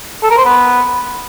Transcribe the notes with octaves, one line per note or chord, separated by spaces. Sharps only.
A4
A#4
C5
B3